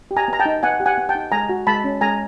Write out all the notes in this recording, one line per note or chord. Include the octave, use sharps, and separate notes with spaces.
G4
G#5 A#5
B3 A#5
G5 A5
D#4
B3 F#5 G#5
G4
F#5 G#5
B3
G5 A5
D#4
G#3 G#5 A#5
F#4
G#3 A5 B5
C#4
G#3 G#5 A#5